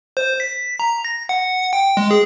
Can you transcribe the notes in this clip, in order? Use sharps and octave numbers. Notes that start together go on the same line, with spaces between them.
C5
B6
A#5
A#6
F#5
G5
G#3
G#4